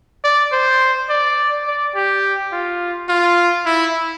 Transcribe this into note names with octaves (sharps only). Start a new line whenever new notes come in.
D5
C5
D5
D5
G4
F4
F4
E4